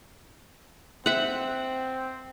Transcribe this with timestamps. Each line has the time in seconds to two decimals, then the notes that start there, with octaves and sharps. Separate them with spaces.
1.06 C4 E5 F#5